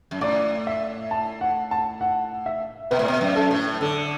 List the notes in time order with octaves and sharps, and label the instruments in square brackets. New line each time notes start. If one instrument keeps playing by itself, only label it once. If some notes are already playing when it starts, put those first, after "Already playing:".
[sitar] F#2
[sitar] A2 [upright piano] D5
[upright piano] E5
A5
F#5
A5
F#5
E5
[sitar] B2 [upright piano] B4
[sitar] A2
B2
F#2
[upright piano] A4
[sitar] A2
[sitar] D3 [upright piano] A4